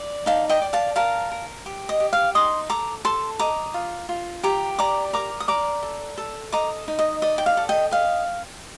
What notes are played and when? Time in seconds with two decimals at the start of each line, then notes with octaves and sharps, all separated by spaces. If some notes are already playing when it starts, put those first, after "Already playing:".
Already playing: D5
0.26 D#4 F5 A5
0.49 D#5 G5
0.62 D5
0.73 F5 A5
0.96 A#4 F5 A5
1.32 A#4
1.66 G4
1.89 D#5
2.00 G4
2.13 F5
2.35 D#4 C6 D#6
2.70 A4 A#5 D6
3.05 A4 A5 C6
3.39 D#5 A#5 D6
3.74 F4
4.09 F4
4.43 G4 A#5 D6
4.79 D5 A#5 D6
5.13 A#4 A#5 D6
5.40 D#6
5.48 D5 A#5 D6
5.83 A4
6.18 A4
6.52 D#5 A#5 D6
6.88 D#4
6.99 D#5
7.22 D5 D#5
7.38 G5
7.46 F5
7.57 A4
7.69 D#5 G5
7.91 D#5 F5